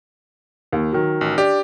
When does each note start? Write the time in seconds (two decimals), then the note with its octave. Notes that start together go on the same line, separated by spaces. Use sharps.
0.73 D#2
0.93 D#3 F#3
1.21 A1
1.38 D4 G4